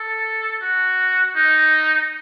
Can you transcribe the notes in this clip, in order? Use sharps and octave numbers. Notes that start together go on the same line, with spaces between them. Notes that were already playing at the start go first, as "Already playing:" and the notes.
Already playing: A4
F#4
D#4